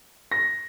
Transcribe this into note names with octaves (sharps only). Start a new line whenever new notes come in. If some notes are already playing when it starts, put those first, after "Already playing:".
A#6